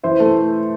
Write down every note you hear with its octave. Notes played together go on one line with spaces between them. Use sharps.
E3 C5 E5
A3